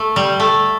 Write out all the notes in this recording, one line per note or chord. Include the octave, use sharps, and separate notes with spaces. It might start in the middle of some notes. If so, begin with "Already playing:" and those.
Already playing: A3
G3
A3